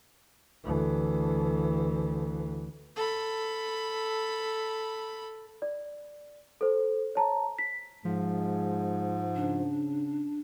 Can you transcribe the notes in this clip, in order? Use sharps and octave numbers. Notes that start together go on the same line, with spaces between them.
D2 E3
A4 B5
D5
A4 C5
C#5 A5 A#5
B6
G#2 F3 G#3
C#3 D4